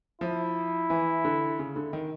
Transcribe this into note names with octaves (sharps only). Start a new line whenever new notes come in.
F3 E4
E3
D3
C#3
D3
D#3